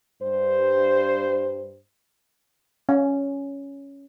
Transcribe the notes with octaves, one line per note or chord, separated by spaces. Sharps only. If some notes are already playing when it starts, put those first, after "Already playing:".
G2 C5
C#4